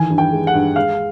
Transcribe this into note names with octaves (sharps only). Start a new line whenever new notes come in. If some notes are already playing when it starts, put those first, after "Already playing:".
Already playing: D#3 E3 G#5
G2
G5
G#3
F#5
G2
G#3 F5